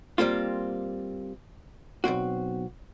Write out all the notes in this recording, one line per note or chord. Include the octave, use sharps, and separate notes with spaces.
G3 A#3 C4 F4
B1 F2 C4 F#4